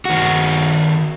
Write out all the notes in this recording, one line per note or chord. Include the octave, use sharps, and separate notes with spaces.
D#3 F#4